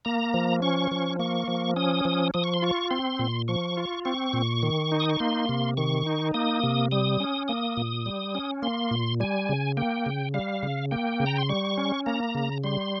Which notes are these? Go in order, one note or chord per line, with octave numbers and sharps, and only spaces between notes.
A#3 A#5
F3
C#4 C#6
F3
A#3 C#6
F3
C#4 D#6
F3
F3 D#6
C#6
C6
F4 C#6
C4 C6
A#2
F3 C#6
F4
C4 C#6
A#2
D#3
D#4
D#6
C#6
A#3 C6
C3
D#3 C#6
D#4
A#3 D#6
C3
G3 D#6
C#4
A#3 D#6
A#2
G3
C#4
A#3 C6
A#2
G3 G#5
C#3
A#3 G5
C#3
G3 F5
C#3
A#3 G5
C#3
A#5
C6
G3 C#6
C#4
A#3 A#5
C#3
G3 C6